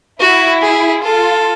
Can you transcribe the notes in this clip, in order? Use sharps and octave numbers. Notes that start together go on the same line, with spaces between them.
E4 F#4
G#4
F4 A4